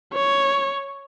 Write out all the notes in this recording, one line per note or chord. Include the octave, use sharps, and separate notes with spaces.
C#5